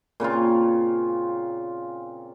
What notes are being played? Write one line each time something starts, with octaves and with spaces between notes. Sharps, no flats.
A#2 C#3 C4 F4